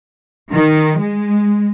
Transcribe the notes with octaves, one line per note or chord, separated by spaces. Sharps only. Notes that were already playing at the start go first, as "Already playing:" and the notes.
D#3
G#3